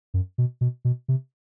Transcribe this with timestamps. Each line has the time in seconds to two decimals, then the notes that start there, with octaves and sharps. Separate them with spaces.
0.14 F#2
0.38 B2
0.61 B2
0.85 B2
1.08 C3